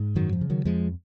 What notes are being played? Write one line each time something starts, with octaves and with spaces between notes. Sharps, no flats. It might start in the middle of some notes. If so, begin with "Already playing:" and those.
Already playing: G#2
F#2 D#3 F#3
F3
C#3
D#3 F#3
F2 F3 G#3